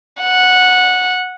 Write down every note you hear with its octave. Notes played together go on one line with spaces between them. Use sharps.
F#5